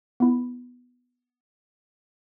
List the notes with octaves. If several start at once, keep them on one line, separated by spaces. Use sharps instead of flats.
B3 E4